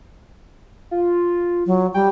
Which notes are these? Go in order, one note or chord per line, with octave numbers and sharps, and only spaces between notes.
F4
F#3
G3 G5